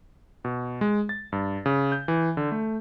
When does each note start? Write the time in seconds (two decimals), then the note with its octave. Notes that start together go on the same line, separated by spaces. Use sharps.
0.45 B2
0.81 G#3
1.09 A6
1.32 G2
1.66 C#3
1.92 G6
2.08 E3
2.37 D3
2.52 A3